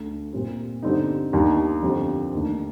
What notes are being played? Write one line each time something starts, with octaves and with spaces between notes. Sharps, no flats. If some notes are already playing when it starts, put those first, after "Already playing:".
Already playing: D2 D3 A3
A#2 G3 C4 G4
D3 G3 C4 D#4
D#2 D#3 G3 D4
F2 D3 G3 C4
D#2 D3 A3 D4